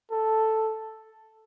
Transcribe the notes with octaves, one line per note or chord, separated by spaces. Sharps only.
A4